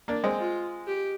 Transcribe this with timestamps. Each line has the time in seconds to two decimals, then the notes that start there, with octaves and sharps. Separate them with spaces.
0.08 A#3 D4
0.24 G#3 C4
0.39 F4
0.87 G4